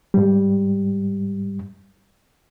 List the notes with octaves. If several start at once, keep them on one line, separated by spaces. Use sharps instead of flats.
G#2 G3